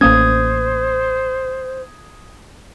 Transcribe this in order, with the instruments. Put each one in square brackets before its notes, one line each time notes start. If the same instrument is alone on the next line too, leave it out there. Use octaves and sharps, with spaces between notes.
[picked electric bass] A1 A#3 C#4 [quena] C5 [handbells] D#6 G#6